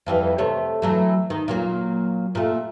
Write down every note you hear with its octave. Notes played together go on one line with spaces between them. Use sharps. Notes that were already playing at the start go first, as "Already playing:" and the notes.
F2 E3 G3
C3 A3 C#5
E3 F#3 A3
D#3
A#2 F#3 A#3
A#2 A3